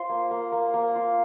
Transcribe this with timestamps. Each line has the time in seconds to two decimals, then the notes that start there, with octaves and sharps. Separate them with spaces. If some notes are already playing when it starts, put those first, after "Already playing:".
Already playing: F4 C5
0.09 A#3
0.31 A#3
0.52 A#3
0.74 A#3
0.96 F4